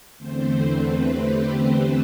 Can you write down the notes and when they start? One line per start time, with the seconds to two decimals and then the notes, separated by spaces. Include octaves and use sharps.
0.17 E2 D3 A3 C4 C5
0.59 B4
1.00 G4